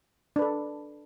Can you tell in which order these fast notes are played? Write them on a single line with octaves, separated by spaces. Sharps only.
D4 B4 A4